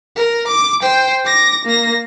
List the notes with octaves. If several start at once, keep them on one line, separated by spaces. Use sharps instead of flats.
A#4
D6
C5 G5
D6 A#6
A#3 A#6